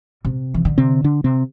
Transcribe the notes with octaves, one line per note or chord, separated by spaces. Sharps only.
C3
E3
D3
C3 C4
D3 D4
C3 C4